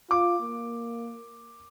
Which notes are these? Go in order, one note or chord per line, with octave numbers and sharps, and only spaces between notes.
F4 D6
A#3